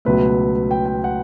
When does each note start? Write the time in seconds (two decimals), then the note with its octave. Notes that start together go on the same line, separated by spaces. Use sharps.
0.05 C#2 B2 F#3 A3 B4
0.71 G5
0.86 G5
1.04 F#5